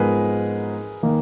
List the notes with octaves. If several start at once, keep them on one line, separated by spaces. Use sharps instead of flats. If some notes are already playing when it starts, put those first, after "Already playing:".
Already playing: G#2 F3 G#3 B3 F4 G#4 A#4 B4
D#3 A#3